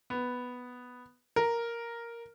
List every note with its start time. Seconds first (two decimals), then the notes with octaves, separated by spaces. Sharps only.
0.10 B3
1.36 A#4